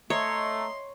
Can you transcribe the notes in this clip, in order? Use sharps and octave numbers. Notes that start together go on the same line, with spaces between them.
A3 C#5 D#5 E5 A#5 C6